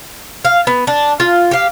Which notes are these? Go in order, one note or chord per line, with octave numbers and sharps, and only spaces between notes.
F5
B3
D4
F4
G4 F5